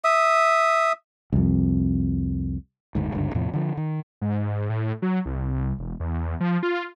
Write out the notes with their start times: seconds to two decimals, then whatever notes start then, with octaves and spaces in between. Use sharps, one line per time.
0.04 E5 D#6
1.33 C2 F2
2.95 F#1 D2 G#2
3.12 F#1 C#2 G2 D3
3.35 E2 A2 C3 F3
3.53 D3 F3
3.77 D#3
4.21 G#2
4.69 A2
5.02 F#3
5.26 C2
5.79 E1
6.00 E2
6.40 F3
6.63 F4